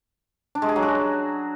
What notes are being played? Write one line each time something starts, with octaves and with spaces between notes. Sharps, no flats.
D4
G#3
G#4
F#3
F#4